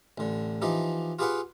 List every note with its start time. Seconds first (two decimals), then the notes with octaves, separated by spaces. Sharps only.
0.18 A1 D3
0.62 E3 F3 D#4 G4
1.19 F4 G4 G#4 B4 F5 F#5